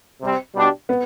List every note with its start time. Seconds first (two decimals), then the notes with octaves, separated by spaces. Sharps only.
0.21 C3 G3 C4
0.55 B2 G3 D4 G4
0.89 B3